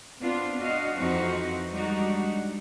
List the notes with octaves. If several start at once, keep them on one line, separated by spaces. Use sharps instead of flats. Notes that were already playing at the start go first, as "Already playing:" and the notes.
B3 C4 D4 F4
D4 F#4 D#5 F5
F2 E3 C4 D#4 F#4
G3 G#3 D4 D#4 F#4